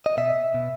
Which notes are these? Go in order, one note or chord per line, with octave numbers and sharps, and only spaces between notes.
D#5
B2 E5
B2